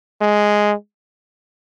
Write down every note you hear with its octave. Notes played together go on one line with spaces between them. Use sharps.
G#3